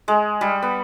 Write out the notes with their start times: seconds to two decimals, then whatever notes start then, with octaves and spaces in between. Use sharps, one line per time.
0.08 G#3
0.41 G3
0.62 B3